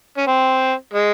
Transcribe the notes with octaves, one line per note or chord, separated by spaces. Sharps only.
C#4
C4
G#3